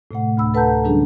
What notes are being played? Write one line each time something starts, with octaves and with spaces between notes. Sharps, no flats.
A2 C3 A3 F#5
D2 B5 E6
A4 B4 F#5 A5 A#5 G6
D3 F#3 G3 C#4 D4 G#4